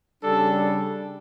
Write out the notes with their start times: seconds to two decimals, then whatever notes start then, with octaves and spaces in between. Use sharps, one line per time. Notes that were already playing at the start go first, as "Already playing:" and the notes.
0.22 C#3 G3 D4 A4